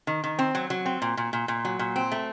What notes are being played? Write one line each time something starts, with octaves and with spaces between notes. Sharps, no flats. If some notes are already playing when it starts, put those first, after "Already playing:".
D#3
D#3
C4
F#3
F#3
C4
A#2
A#2
A#2
A#2
F#3
A#2
C4
A3